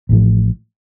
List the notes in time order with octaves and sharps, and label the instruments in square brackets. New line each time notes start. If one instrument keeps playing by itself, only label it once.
[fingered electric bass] A1 A2 F3